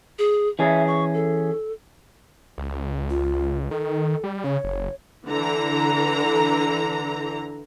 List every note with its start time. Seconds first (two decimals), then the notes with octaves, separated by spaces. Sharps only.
0.19 G#4
0.59 E3 C#4 G#4 E5
0.87 C#6
1.14 A4
2.58 C#2
3.10 F4
3.71 D#3 A4
4.24 G3
4.44 C#3 C#5
4.64 F#1
5.29 D3 E3 A#5